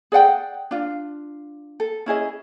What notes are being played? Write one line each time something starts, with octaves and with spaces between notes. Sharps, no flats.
G#4 D5 F#5 G5
D4 F4
A4
C#4 E4 G#4 D#5